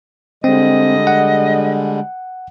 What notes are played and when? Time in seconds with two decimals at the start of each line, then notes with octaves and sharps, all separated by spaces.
0.44 D3 G3 G#3 C4 D#5
1.07 F#5